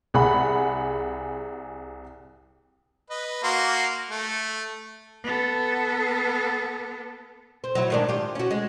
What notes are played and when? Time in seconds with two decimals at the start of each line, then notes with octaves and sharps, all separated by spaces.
0.14 C2 G#4 F#5 B5
3.10 B4 D#5
3.44 A#3 F#4 C6
4.11 A3
5.24 B3 A4
7.64 C4
7.75 F#3 E4
7.90 G#2 D#3 D4
8.08 F4 G4
8.35 C#4 F#4
8.51 G#3